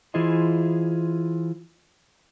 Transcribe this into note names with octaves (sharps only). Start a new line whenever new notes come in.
E3 E4 F4 G#4 C5 D#5